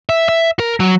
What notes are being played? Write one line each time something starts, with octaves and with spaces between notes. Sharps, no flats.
E5
E5
A#4
F#3